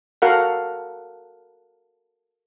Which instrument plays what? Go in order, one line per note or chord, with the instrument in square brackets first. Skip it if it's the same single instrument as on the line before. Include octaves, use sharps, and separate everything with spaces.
[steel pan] F#4 A4 A#4 F5 F#5